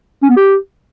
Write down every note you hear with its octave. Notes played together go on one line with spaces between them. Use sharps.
C#4
B3
G4